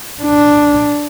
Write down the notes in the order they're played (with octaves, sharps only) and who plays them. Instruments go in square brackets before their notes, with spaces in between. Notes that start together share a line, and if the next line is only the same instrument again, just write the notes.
[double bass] D4